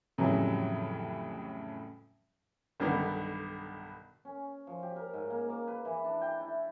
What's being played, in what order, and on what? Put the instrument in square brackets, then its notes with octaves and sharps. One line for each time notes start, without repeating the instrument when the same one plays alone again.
[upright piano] F2 A2 C#3 E3 F#3 G3
[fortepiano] B1 G2 B2 D3 D#3 B3
[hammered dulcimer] C#4
F3
G4
A#4
G#2
A#3
D6
B4
E3
D4
G5
E4